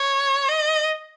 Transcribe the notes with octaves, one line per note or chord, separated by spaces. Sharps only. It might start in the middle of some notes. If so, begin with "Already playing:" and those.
Already playing: C#5
D#5